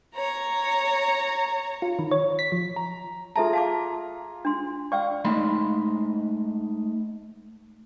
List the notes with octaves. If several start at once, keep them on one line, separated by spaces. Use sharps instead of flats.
C#5 A#5
F4
D#3
C#5
B6
F3
A#5
F4 G#4 A4 E5 A5 A#5
F5 A5 D6
D4 C6
D5 F5 G5 C#6 E6
G#3 A3 D#4 D#5 B5 C6